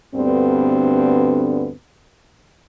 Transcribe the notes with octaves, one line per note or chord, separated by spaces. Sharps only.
D2 G2 D3 B3 C4